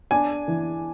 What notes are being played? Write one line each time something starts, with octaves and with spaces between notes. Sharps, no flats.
D4 G#5
E3